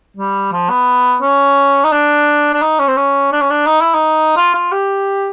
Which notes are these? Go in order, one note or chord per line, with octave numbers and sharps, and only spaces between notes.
G3
F3
B3
C#4
D#4
D4
D4
D#4
C#4
C4
C#4
D4
C#4
D4
D#4
E4
D#4
F4
F4
G4